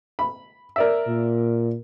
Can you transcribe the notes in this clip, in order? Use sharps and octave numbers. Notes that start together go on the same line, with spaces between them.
B5
A#4 D5 E5
A#2